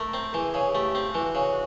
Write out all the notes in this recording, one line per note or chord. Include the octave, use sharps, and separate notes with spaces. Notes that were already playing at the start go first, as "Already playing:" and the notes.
Already playing: A3 A#4
C4
E3 G#4
C#3
A3 G4
C4
E3 F#4
C#3